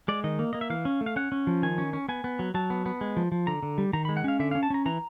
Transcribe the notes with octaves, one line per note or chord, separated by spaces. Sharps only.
G#3 D5
D#3 D#5
A#3
A#3 D#5
E5
E3 F5
C#4
A3
F5
C#4 F#5
C#4
F3
D#3 G#5
C#4
C#4
B3 G#5
B3
F#3
F#3 A5
B3
B3
G#3
F3
F3
D3 A#5
D3
G3
D#3 A#5
B5
G#3
F#5
C#4 F5
D3 E5
F5
C#4
A5
C#4 A#5
E3 A#5